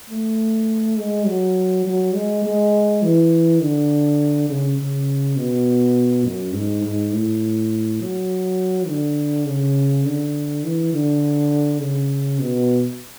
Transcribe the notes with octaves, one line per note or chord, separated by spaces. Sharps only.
A3
G#3
F#3
F#3
G#3
G#3
E3
D3
C#3
C#3
B2
F#2
G#2
G#2
A2
F#3
D3
C#3
D3
E3
D3
C#3
B2